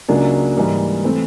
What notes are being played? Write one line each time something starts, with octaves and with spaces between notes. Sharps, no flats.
C#2 C#3 F#3 A#3 D4
G#2 E3 G3 A#3
E3 A3 C4